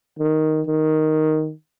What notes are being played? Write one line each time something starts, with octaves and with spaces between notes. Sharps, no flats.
D#3
D#3